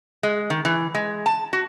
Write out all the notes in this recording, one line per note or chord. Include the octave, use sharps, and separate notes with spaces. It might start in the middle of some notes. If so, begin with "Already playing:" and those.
G#3
D#3
E3
G#3
A5
F#4